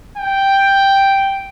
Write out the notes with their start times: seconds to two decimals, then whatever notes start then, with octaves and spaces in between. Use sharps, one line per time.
0.17 G5